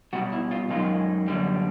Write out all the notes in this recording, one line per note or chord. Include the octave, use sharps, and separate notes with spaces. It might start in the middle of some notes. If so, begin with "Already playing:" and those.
B2 G3 F#4
E4
F4
F#2 D#3 G#3 F4
F#2 D3 G3